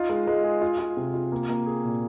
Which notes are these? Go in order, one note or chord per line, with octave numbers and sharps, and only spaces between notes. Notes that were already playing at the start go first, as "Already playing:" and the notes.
Already playing: D#4 F4
G#3
G#3
G#4
F4
F4
C3
F4
A#3
A#3
G#4
A#2